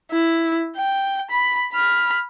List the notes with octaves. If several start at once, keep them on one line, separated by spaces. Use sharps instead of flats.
E4
G5
B5
B5 F6